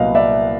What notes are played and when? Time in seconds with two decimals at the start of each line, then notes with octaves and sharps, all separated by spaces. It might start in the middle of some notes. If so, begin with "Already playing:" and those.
Already playing: C2 A#2 F#3 B3 D#5 F5
0.15 D5 E5